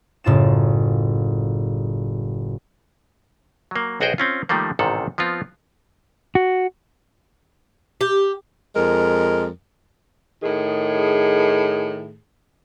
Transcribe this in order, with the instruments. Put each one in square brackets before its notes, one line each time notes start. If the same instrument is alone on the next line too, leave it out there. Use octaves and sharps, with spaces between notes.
[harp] F#1 A2 F4 A6 E7
[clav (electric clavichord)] F#3 A#3
B1 F#4 G#4 C5 D#5 G5
C4 C#4 F4
D#3 F3 G3 A3 A#3
A1 G#2 C3 D#3 A4 F#5
F3 B3 C4 F4
[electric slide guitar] F#4
[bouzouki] G4
[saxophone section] F2 G#3 A#4
A2 D#3 G#4